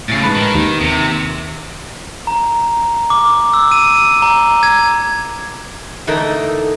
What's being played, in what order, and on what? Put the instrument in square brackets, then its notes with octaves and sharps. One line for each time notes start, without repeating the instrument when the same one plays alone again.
[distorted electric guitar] A2 C#3 [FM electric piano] A6 C7
[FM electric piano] G#2 B4 A5
[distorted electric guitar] D#3
[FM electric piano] D#2
[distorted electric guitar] C3
[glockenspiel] A#5
D6
E6
D#7
A#5
G#6
[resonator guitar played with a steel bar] D3 E3 A3 D#4 A4 A#4